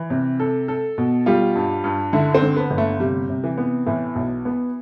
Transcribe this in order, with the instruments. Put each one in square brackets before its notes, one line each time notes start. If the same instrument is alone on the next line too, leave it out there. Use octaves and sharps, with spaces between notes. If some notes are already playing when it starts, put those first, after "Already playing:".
Already playing: [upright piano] E3
C3
A4
A4
B2
[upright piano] G3 [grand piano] F4
[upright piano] G2
G2
[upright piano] D3 [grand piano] E4
[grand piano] C4
[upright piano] D3
[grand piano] B3
[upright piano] G1
[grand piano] A3
[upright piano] C3 [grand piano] G3
[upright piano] C3
[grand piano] E3
[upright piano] B3
[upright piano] A2 [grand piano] E3
[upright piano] B1
B3